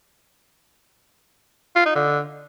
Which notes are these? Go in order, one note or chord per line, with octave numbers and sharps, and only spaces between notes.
F4
D#4
D3